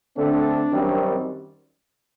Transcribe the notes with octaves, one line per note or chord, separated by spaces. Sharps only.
D3 A3 C4 D4
F#2 D#3 G3 C4